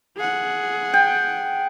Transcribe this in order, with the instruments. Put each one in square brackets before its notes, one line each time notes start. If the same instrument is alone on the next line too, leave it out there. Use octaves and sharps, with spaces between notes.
[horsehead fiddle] G#4 F#5
[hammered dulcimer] G5